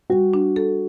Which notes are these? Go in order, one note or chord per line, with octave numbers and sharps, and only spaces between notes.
G3 F#4
D4
A4